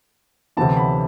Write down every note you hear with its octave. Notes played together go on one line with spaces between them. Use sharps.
D2 C3 E3 B3 E4 A5
B5